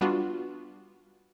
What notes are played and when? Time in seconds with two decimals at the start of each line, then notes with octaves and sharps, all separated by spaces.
0.01 G3 B3 D4 F4 F#4